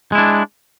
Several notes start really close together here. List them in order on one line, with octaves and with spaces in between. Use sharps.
G#3 E4 D4